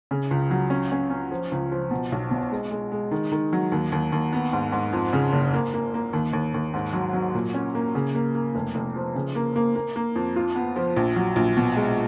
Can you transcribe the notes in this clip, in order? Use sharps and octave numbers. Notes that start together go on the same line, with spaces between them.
C#3
C#2
F#3
C#4
C#4
C#4
F3
C#2
F3
B2
B1
B2
G#3
G#3
G#3
D#3
D#3
F#3
D#2
D#2
D#2
B3
G#2
G#2
F2
C#3
F#1
A#3
A#3
A#3
D#2
D#2
D#2
G#2
F#3
F#3
A#2
C#4
A#3
C#3
A#3
A#3
F1
F1
F3
C#3
A#3
A#3
A#3
A#3
F2
F4
B3
F3
A#1
F#3
A#1
B2
G#3